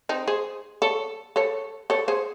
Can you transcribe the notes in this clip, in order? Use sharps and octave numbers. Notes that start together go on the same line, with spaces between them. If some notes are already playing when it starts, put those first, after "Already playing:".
C4 D#4
G#4 C5
A4 C#5
A4 C#5
A4 C#5
G#4 C5